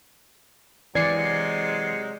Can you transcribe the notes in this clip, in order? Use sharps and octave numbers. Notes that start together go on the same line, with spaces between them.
C3 E3 F#3 G#3 D5 G#6 C7 C#7